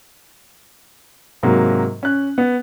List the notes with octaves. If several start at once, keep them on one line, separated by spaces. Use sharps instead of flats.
G#2 C3 F#3 A#3
C#4 F#6
B3